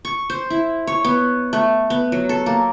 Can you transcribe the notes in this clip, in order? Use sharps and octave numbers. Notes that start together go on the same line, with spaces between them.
C#6
C5
E4
C#5
B3
A3
B3
F#3
A4
A#3